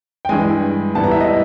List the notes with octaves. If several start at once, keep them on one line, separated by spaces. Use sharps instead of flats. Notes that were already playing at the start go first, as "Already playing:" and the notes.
G5
G2 E3 G#3 G#5
A2 E3 G3 B3 A5
A#5
E5
D#5
E5